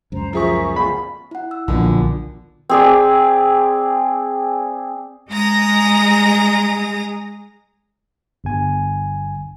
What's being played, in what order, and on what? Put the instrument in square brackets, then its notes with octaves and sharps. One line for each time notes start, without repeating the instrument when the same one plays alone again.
[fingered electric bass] C#2 F#2 [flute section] C5 A#5
[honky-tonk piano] F3 G#4 C#6 [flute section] A#4 E5
[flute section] F4 [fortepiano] B5
[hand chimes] E4 F#5
E6
[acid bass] B1 [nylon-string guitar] A#2 D3 F3 [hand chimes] F4
[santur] C4 G#4 D5
[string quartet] G#3 G#4 D#5 A#5 D#6 A#6
[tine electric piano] G1 G#5